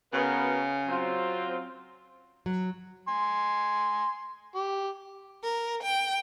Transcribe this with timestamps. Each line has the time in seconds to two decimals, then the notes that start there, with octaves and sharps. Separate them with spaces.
0.13 C#3 B3 F#4 A#4
0.87 F#3 C4 F4
2.46 F#3
3.08 G#5 C6
4.55 G4
5.43 A#4
5.83 G5